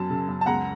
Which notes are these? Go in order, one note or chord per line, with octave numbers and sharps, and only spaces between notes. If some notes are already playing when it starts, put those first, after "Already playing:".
Already playing: F#2 F#3 A5
C#3
F#2
A5
C#2 F#5 A#5